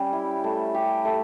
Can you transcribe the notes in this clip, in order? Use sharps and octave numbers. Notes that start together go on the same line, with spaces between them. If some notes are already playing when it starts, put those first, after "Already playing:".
Already playing: G3 C#4 G4
E4
A3
G4
A3